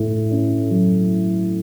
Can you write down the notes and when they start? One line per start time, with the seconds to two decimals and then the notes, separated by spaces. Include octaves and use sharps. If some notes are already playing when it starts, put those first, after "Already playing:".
Already playing: A2 E4
0.31 C#4
0.70 F#3